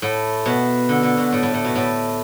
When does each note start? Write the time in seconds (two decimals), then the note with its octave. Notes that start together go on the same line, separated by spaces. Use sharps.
0.02 A2
0.46 B2
0.89 D3
1.03 D3
1.17 B2
1.32 A2
1.43 A2
1.54 A2
1.64 B2
1.75 A2